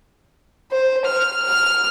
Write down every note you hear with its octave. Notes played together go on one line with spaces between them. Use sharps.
C5
F6
F6